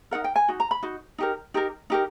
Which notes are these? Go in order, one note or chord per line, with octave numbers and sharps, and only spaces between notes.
D#4 F#4 A#4 F#5
G5
G#5
D#4 F#4
A#5
B5
D#4 F#4
D#4 G4 A#4
D#4 G4 A#4
D#4 G4 A#4